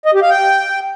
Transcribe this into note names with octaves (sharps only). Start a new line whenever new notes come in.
D#5
G4
F5
G5